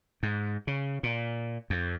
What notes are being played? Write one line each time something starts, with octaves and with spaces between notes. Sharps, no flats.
G#2
C#3
A#2
F2